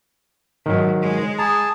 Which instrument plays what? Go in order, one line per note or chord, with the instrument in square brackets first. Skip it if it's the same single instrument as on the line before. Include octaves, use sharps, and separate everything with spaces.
[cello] G#2 [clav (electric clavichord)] D#3 F#3
[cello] G#3
[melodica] G#4 A5 [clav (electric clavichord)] A#5